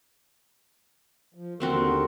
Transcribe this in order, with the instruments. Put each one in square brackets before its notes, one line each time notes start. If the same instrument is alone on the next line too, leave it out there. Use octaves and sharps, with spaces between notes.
[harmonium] F3
[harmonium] D#2 D3 A#4 [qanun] A3 C4 F#4